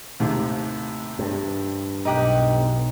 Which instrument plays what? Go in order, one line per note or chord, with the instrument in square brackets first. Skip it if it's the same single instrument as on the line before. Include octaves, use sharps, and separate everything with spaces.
[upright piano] D#2 A2 C3
[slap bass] G2
[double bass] B1 [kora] D#4 G4 F#5